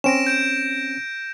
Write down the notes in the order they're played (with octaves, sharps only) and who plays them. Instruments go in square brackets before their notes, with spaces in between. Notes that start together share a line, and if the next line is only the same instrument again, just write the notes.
[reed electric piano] C4 C#4 [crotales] A#6 D7 E7
[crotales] G6 D7 E7